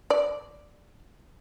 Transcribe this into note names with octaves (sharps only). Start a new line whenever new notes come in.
D5